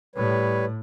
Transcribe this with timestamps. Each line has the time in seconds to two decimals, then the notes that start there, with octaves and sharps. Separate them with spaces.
0.16 A2 G3 B4 C#5